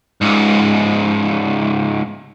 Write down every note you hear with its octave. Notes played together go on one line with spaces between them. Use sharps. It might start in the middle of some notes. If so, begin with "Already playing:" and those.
C#2 G#2